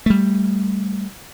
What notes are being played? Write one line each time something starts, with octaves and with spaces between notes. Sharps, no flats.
G3 A3